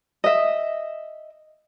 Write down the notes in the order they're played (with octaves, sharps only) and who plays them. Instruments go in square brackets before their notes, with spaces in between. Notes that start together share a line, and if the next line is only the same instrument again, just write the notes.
[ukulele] D#5 E5